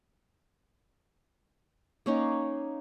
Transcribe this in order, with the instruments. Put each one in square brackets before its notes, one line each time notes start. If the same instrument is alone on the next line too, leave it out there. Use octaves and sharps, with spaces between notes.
[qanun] A#3 C#4 D#4